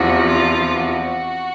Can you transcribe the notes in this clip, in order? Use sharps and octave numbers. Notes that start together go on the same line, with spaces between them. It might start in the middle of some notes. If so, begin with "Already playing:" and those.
Already playing: E2 C3 F3 F#4
F4
F#4